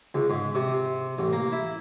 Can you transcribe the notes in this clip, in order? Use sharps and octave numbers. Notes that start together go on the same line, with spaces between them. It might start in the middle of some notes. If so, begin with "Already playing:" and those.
C#2
G#2
C3
A1
A#3
E4